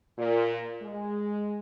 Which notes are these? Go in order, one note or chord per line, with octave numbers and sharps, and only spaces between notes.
A#2
G#3